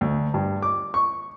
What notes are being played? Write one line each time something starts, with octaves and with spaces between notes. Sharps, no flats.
D2
G2
D6
C#6